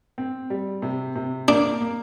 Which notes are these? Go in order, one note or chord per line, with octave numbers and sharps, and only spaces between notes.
C4
G3
C3
C3
A#3 D4
A#3